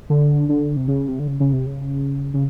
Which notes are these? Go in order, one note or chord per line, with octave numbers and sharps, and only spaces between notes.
D3
D3
C3
C#3
C3
D3
C#3
C#3
C3
C#3
C#3